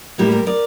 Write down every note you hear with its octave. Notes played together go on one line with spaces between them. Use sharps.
A2 G3 A#3 E4 G4
G4 A#4
A#4 D5